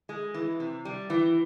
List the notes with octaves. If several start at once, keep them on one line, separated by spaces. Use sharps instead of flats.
G#3
E3
C3
G3
E3